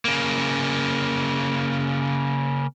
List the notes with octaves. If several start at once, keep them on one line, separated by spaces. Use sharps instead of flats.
C#3 A#3